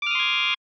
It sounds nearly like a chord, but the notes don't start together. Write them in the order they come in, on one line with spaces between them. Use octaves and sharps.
D6 F6 D#6 C6 G#6